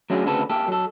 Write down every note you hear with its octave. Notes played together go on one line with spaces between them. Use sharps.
F#3 A3 C#4 D4 F#4 G#4
D2 C#3 C4 F#4 A4 B4
A#3 G4 A4
F#3 A4